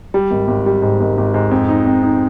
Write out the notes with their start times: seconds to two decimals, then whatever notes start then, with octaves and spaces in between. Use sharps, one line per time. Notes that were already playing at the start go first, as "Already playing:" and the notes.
0.14 G3
0.31 G#1
0.48 G#1
0.66 G3
0.82 G#2
1.00 G#1
1.18 G#1
1.34 G#2
1.51 F2
1.69 D#4
1.86 F2
2.03 D#4